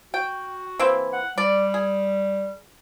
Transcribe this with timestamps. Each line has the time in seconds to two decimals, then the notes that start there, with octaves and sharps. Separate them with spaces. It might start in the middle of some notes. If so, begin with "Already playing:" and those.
0.14 F#4 G5
0.79 E3 A#3 C4
1.13 F#5
1.38 G3 D5
1.74 G#4